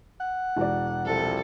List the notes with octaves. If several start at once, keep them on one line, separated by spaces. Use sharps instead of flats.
F#5
E1 F#4 D5
C2 F3 A4